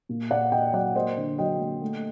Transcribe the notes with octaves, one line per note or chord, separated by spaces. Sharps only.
A#2
A#2 D5 F#5
A#2 D#5 G5
F#3 D5 F#5
A#3 C5 D#5
D3
F#3 D#5 G5
A#3
A3